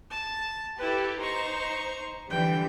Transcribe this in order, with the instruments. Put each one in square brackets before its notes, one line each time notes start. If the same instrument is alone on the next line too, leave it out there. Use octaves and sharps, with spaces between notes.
[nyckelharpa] A5
[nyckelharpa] E4 B4 [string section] G4 A4
[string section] D#4 C5 [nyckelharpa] A#5 C#6
[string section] D3 E3 G3 [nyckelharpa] G5